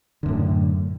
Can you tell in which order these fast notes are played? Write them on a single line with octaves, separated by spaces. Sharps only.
D3 F#2 A2